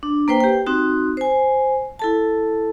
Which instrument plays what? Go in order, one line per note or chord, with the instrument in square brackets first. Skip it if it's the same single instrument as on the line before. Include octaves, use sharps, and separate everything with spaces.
[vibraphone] D4
A#3 B4 C5 G5
G4 G5
C4 D#4 F#4
C5 G#5
E4 A4 A5